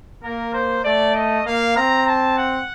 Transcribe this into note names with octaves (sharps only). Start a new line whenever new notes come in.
A#3 A#4
C5
A3 D5
D#5
A#3 F5
C4 A#5
A5
F#5